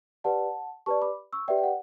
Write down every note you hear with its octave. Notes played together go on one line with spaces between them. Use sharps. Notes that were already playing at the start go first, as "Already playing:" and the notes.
G4 B4 D5 F#5 A5
G4 B4 D5 A5 C#6
B5 D6
C#6 E6
G4 B4 D5 E5 G5
G5
F#5